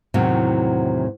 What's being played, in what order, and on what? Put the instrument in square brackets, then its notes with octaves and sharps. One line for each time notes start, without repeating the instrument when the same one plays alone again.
[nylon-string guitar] E2 A2 C3 D#3 F#3